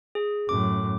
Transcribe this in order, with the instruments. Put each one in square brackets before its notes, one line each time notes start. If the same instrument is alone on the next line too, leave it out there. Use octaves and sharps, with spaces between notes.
[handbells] G#4
[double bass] F#2 A2 [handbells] D6